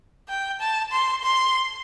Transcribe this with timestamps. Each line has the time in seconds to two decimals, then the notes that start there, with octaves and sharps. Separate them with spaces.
0.28 G5
0.60 A5
0.92 C6
1.23 C6